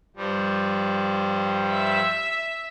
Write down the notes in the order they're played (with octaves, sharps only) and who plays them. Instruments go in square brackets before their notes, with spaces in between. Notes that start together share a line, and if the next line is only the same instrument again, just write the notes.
[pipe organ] G2 F3 G3
[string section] E5